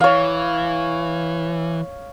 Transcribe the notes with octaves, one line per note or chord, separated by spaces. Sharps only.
E3 C#5 F5